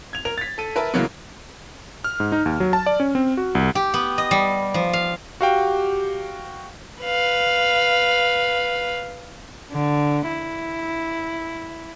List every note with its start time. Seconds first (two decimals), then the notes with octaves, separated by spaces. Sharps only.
0.13 G#6 F7
0.25 A#4 F7
0.38 A6 B6
0.58 A4 D#7
0.76 A#4 B4 E5 A5
0.94 C#3 E3 F#3 G#3 A#3 B3
2.04 F6
2.20 G#2
2.32 D#4
2.46 D#2
2.60 F#3
2.73 A5
2.86 D5
3.00 C#4
3.15 C4
3.37 F#4
3.55 C2
3.75 G4
3.94 B3
4.18 D#5
4.31 G3
4.74 F3
4.93 F5
5.41 F#4 G4 F5 G5
7.02 B4 F5
9.71 D3
10.28 E4